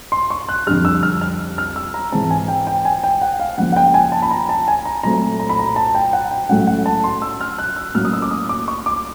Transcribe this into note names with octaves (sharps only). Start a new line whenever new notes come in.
C6
C#6
F#6
F2 D3 G3 F6
E6
F6
F6
F6
E6
A#5
G#2 E3 G#3 C4 A5
G#5
G5
G5
G#5
G5
F#5
F5
C#3 F3 A#3 F#5
F#5
G5
G#5
A5
B5
A#5
A5
G#5
A#5
A#2 F#3 A3 C4 A#5
A#5
B5
A#5
A5
G5
F#5
G5
A2 F#3 A3 C#4 F#5
F#5
A5
C6
E6
F6
F#6
E6
A2 F#3 A#3 C#4 F6
D#6
E6
D6
D#6
D6
C#6
D6